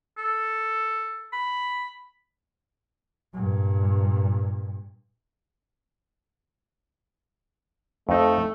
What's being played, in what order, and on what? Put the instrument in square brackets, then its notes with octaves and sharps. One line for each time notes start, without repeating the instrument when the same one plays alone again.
[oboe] A4
B5
[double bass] G2 A#2
[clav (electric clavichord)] F2 D#4 [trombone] A3